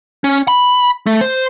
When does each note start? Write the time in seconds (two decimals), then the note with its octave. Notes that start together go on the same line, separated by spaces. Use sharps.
0.24 C#4
0.48 B5
1.06 A3
1.21 C5